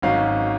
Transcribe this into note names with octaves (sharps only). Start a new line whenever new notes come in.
G#1 G#2 F#3 C#4 F5